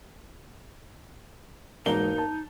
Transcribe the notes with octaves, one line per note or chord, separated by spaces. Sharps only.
E1 G#2 A#3 D#4 G7
A5